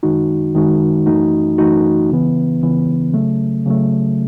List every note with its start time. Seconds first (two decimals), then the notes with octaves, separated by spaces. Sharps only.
0.03 F#2 D#3 G#3 D#4 F#4
0.54 F#2 D#3 G#3 D#4 F#4
1.06 F#2 E3 A3 D#4 F#4
1.58 F#2 E3 A3 D#4 F#4
2.10 C#2 C#3 E3 B3
2.61 C#2 C#3 E3 B3
3.13 C#3 F#3 A3
3.66 C#3 F#3 A3